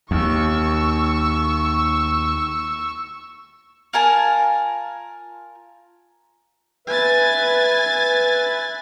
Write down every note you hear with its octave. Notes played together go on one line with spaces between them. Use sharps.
D#2 C#6 E6
F4 A#4 G#5 A5
B4 E5 G#5 A6